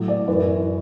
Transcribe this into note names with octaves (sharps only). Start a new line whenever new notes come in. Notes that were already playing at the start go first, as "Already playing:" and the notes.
Already playing: A2 F#3
D5
F#2 E3 B4